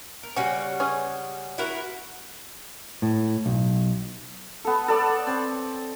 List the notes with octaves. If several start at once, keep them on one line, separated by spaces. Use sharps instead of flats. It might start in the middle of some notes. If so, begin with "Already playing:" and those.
A#4
C#3 G3 C#4 F#4
C#4 G#4
E4 F#4 A#4
A2
B1
B3 A4
A4 D5
C4